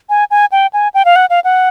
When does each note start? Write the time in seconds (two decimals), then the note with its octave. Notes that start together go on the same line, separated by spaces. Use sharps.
0.09 G#5
0.31 G#5
0.52 G5
0.73 G#5
0.94 G5
1.05 F5
1.16 F#5
1.30 F5
1.44 F#5